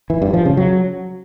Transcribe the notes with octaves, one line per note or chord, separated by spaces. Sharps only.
E3
G2
F3
C#3
F#3